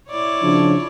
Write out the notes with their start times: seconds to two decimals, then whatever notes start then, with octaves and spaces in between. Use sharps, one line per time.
0.11 E4 C#5 D5
0.42 C#3 F3 D4